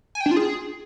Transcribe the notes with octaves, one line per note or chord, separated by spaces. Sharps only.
G#5
G5
D4
F4
G#4